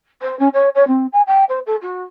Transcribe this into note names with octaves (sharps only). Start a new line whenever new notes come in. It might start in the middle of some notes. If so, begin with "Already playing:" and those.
C5
C#4
C#5
C#5
C4
G#5
G5
C5
A4
F#4